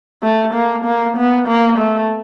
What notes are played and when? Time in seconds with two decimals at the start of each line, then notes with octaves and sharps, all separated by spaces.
0.23 A3
0.54 A#3
0.85 A#3
1.17 B3
1.48 A#3
1.78 A3